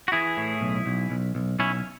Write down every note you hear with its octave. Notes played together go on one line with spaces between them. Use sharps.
F#4
E3 E4 G#4
A2
B1
B1
B1
B1
B1 C#4 E4